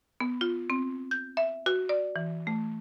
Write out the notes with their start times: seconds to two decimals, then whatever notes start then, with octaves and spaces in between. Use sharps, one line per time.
0.20 B3
0.41 F4
0.70 C4
1.11 G6
1.37 E5
1.66 F#4
1.89 D5
2.16 E3
2.47 A3